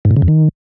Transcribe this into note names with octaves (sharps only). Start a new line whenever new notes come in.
G#2
A2
C#3
F2
D#3